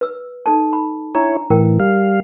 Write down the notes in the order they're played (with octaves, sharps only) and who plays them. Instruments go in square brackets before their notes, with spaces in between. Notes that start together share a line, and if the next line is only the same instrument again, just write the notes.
[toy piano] B4 E6
D#4 A4 A5
B5
[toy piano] D4 A#5 [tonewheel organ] E4 C#5
[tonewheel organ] A2 E3 [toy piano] A#4 G5
[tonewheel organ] G3 F5